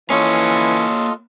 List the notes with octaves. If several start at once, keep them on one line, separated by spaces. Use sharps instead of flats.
E3 A#3 C#4 F4 A4 C#5 D#5